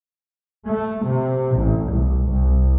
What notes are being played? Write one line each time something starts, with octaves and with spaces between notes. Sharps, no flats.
A3
C3
A1
C2
C2